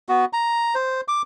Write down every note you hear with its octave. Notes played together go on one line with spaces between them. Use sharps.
B3 F#4
A#5
C5
D6